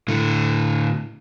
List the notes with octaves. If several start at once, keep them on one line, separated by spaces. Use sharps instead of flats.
A2 D3